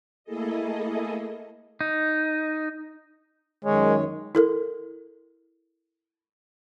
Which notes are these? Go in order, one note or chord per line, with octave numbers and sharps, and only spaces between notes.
A3 A#3 E4 G#4 A4 D#5
D#4
F#2 D#3 G#3 C#5
E4 A4 A#4